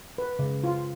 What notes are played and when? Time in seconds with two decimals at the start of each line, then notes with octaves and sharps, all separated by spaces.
0.18 B4
0.39 C#3
0.64 F4